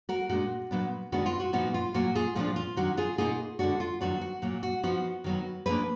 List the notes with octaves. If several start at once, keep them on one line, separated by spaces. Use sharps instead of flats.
F#4 A#4
A#2 G#3 D4 F#4
A#2 F#3 B3 D4
D#3 G#3 B3 D4 F#4
F4
F#4
A#2 F3 B3 D#4 F#4
F4
A#2 F#3 A#3 F#4
F4 G#4
A#2 F3 A#3 D4 F4
F4
D#3 F#3 D4 F#4
F4 G#4
B2 A#3 D#4 F4 G#4
D3 G#3 D4 F#4
F4
D#3 F#3 B3 D4 F#4
F#4
A#2 F#3 A#3
F#4
F3 B3 D#4 F#4
D#3 F#3 B3
D3 F3 A#3 D4 G#4 B4